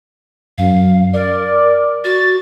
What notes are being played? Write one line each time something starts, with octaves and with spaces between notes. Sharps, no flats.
F#2 F5
A#4 D5
F#4 A6